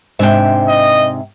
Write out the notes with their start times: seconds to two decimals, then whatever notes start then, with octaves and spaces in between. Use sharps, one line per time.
0.19 G#2 C3 D4 E5 G5
0.69 D#5